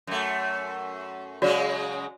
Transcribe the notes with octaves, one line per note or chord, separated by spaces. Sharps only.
F#2 A3
C#3 F#3 G#3 F#4 C#5 D5